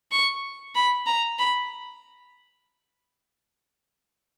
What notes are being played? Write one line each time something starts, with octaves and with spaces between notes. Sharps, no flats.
C#6
B5
A#5
B5